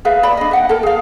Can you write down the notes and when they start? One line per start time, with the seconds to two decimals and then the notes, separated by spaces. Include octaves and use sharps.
0.05 G#4 B4 E5 F5
0.23 D5 B5
0.37 D4 D#5
0.51 E5 F#5 G5
0.69 A4 A#4
0.83 G#4 F5